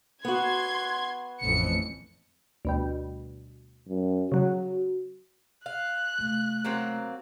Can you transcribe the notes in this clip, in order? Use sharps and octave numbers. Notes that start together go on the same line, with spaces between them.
B3 F#4 C6 G#6
A1 F2 E3 C#7
D2 B2 G3
F#2
C#3 F#3 F#4
F5 F#6
C3 A3
F#3 A#3 C4